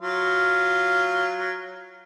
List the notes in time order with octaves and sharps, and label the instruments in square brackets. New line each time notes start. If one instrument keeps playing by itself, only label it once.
[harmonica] F#3 F4